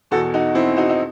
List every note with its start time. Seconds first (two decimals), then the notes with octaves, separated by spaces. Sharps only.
0.11 E2 B2 F#4 A4
0.34 D#4 F#4
0.55 C4 E4
0.76 D#4 F#4
0.89 D#4